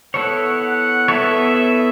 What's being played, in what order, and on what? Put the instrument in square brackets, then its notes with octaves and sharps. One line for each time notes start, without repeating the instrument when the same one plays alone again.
[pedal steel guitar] B3 E4 A4 C#5 [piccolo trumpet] F#5
[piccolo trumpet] F#5
[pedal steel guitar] B3 E4 A4 C#5 [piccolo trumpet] E5
[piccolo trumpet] E5